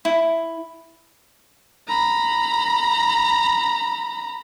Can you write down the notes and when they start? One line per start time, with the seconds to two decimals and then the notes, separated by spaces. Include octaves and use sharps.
0.05 E4
1.88 A#5 B5